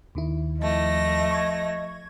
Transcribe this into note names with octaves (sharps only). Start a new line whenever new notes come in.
D#2 D#3 E4
F3 A3 D#5 A#6
C#6 G#6